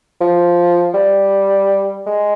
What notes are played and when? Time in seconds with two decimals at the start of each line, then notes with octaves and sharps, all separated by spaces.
0.21 F3
0.94 G3
2.06 G#3